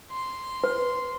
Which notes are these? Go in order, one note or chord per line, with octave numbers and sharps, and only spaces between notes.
C6
B4